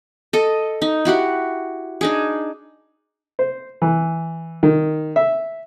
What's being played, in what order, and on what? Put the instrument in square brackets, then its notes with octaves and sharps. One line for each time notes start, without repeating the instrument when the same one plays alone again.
[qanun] A4 D#5
D#4
E4 F#4 G4 F#5
D4 D#4 G#4
[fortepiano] C5
E3
D#3
E5